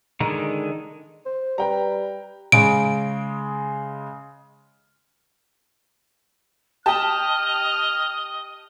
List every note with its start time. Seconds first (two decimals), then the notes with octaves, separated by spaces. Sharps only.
0.20 D3 D#3 G#3 A#5
1.26 C5
1.58 G3 B4 G5 A#5
2.52 C#3 G#3 D7
6.86 G4 D#5 A5 F6